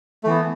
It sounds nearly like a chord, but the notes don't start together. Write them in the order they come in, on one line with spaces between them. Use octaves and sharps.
A3 E3 B3